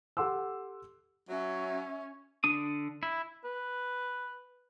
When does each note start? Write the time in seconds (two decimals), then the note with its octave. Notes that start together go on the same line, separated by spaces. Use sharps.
0.17 G4 A4 F#5 C6 D6 E6
1.29 F#3 C#4 E5
2.44 D3 D4 D#6
3.03 E4
3.45 B4